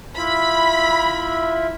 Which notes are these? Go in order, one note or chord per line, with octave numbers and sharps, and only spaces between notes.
E4 F4 E5 B5